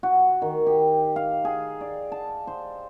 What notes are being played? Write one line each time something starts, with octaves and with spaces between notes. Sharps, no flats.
F#4
D#3
G4
F5
G#4
D5
A5
C5